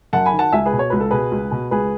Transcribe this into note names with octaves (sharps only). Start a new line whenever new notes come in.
F#2 F#5 A5
G#5 B5
D#3
F#5 A5
C#2 E5 G#5
G#4 B4
B2
C#5
C#2 B4
A4
B2 G#4 B4
C#2
B2
C#2 G#4 B4